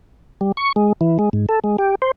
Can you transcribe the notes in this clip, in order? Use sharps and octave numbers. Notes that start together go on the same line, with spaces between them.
G3
C#6
G#3
E3
G#3
G#2
A4
G#3
G4
C5